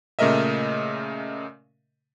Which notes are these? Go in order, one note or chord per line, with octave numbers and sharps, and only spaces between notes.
A#2 C#3 A3 A#4 D#5 E5